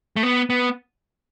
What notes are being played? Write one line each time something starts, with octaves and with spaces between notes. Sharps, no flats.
A3
B3
B3